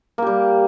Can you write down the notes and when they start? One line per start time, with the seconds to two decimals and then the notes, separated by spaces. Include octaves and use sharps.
0.18 A#3
0.22 G4
0.27 G3